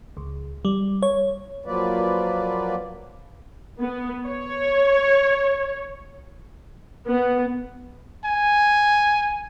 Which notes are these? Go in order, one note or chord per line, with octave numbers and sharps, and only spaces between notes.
C#2
G3
C#5
F3 F#3 A#3 F4 B4 D5
B3
C#5
B3
G#5